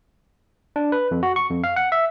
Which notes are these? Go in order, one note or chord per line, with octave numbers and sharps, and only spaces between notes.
D4
B4
F2
F#4
C#6
F2
F5
F#5
E5